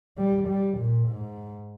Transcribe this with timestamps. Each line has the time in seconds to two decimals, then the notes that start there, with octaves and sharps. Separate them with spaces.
0.18 G3
0.48 G3
0.78 A#2
1.08 G#2